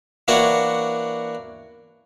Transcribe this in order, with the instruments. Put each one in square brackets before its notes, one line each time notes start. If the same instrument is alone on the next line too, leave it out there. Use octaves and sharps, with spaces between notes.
[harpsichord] E3 A#3 D4 F#4 C#5 F#5